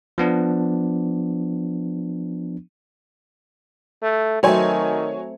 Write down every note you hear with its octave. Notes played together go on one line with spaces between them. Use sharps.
F3 B3 D4
A3
D#3 F#3 A3 C4 C#5 G#5